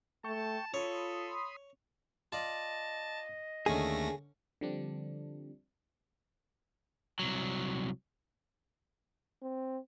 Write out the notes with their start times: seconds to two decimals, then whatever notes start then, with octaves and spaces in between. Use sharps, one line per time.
0.24 A3 G5 A5 C#6
0.74 F4 A4 C#5 B5 C6 D#6
2.32 F4 D5 D#5 A5
3.66 D#2 D3 D#3 A3 C#4 G#4 A#6
4.61 D3 F3 G3 C4 D4
7.19 C2 F#3
9.43 C4